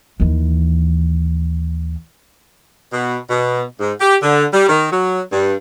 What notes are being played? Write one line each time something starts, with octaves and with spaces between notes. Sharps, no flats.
D#2 E3
B2
B2
G#2
G4
D3
G3
D#3
F#3
G2